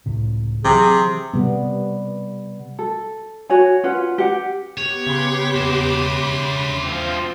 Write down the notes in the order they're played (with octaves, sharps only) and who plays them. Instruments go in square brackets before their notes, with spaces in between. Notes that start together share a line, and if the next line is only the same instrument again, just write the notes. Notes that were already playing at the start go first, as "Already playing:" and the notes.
[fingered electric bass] C#2 A2 C3
[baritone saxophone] C3 [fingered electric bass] E3 F#3 [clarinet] G#4
[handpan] C3 G3 B3
[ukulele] A4
F#4 C#5 F#5 G#5
C#4 F4 B4 F#5
G4 F#5
[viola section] B3 G4 [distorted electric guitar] C#5
[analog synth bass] C#3 [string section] B5 C6 D6
[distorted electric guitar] F#4 E5
[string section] F3 C4